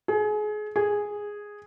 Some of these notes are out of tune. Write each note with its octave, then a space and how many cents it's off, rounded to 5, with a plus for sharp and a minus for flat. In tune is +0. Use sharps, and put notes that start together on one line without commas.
G#4 +30
G#4 -5